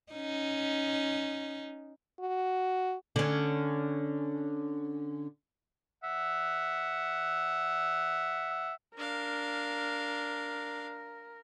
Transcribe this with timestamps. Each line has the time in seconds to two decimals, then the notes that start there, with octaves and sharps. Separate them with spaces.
0.13 C#4 D#4
2.20 F#4
3.16 D3 C#4
6.04 E5 F#5
8.97 D4 A#4 F5